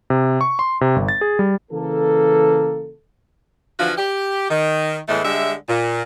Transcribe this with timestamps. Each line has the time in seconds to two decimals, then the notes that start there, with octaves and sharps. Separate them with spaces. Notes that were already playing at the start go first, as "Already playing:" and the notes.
0.10 C3
0.41 C#6
0.59 C6
0.81 C3
0.96 G1
1.08 A6
1.21 G#4
1.39 G3
1.72 C#3 E3 A#3 A4
3.79 D3 E3 F3 F4 F#4
3.98 G4
4.50 D#3
5.09 E2 A2 E3 G#3 A3
5.24 D3 G3 G#3 E5
5.69 A#2